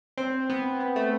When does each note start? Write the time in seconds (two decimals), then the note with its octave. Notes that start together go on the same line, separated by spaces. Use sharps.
0.18 C4
0.50 B3
0.80 B3
0.96 A3